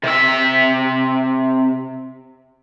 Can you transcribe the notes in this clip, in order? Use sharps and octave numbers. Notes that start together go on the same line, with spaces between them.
C3 E5